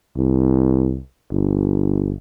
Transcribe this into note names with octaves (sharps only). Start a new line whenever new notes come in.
C2
G1